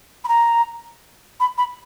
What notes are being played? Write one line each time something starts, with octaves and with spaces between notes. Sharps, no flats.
B5
A#5
B5
B5